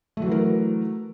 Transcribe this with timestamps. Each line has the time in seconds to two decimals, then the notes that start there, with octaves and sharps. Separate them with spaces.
0.17 A3
0.22 F#3
0.27 E3
0.31 A#4